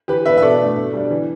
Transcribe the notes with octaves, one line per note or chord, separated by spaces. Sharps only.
E3 G4 B4
B3 D4 B4 E5
E5
B2 A4 D5
A3 D4
B2
G3 D4
E3